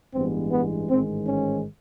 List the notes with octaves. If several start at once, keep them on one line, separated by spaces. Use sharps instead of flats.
A1 G2 E3 G#3 B3 C4
B3
A1 G#2 D#3 G#3 C4
C#4